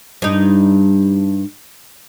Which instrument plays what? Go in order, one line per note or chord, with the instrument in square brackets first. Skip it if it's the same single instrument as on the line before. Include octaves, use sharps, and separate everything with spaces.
[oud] G2 D#4